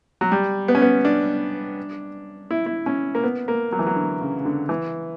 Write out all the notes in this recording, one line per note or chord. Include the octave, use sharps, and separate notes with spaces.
F#3
G3
B3
C#4
B3
D4
E4
E4
C#4
A#3
B3
A#3
F#3
E3
F#3
D3
C#3
C#3
D3
E3